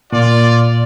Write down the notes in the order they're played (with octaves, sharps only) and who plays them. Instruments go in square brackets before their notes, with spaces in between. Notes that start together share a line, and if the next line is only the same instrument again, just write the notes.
[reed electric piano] A#2 [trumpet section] F4 D5